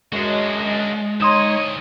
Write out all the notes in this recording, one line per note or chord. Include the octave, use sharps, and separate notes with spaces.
F#2 G#3 D4 F#4 D#5
D2 D#4 C#5 D#5 C6 D#6 E7